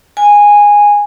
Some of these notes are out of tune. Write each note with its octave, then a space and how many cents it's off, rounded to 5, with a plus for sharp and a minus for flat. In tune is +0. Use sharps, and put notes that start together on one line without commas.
G#5 -10